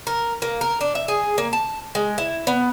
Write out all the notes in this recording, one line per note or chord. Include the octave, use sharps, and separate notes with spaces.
A#4
A#3
A#4
D4
E5
G#4
A#3
A5
G#3
E4
B3